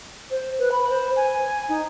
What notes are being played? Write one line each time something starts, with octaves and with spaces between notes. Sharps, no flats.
C5
B4
B5
C5
G#5
D#4